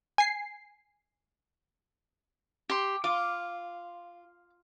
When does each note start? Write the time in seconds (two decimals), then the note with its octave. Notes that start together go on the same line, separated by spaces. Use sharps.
0.18 G#5 C7
2.69 G4 C6
3.04 F4 D6